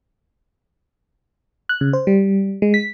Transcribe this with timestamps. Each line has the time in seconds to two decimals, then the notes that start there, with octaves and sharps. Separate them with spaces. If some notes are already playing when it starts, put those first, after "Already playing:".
1.69 F#6
1.81 C#3
1.93 C5
2.07 G3
2.62 G#3
2.74 B6